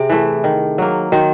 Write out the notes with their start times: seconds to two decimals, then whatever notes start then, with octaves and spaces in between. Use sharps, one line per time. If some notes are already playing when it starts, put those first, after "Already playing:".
Already playing: C3 G#4
0.09 E3 A3
0.44 D#3
0.78 F#3 A#3
1.12 D#3 F#4